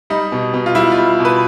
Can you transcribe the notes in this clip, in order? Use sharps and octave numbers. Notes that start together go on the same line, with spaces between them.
G3 D#4
B2
B2
F4
G3 E4
F4
G3
B2
B4